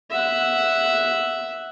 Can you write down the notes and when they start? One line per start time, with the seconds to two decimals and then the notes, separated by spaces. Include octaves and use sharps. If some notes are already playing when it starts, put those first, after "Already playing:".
0.11 E5 F#5